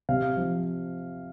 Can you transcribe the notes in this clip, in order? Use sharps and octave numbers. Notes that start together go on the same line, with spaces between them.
C3 F5
F3